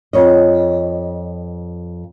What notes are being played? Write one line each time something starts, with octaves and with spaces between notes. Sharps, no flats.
F2 C#5 D#5